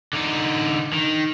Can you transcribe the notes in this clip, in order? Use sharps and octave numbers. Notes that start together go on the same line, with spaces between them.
D3 D#4
D#3